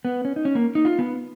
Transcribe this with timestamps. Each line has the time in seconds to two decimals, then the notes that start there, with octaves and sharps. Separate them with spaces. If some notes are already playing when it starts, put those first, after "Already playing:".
0.05 B3
0.25 C#4
0.36 D#4
0.45 C#4
0.55 A#3
0.75 D#4
0.85 F4
0.99 B3